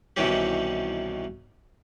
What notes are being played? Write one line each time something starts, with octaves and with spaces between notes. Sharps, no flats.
C2 B2 D#3 E3 C#4 G4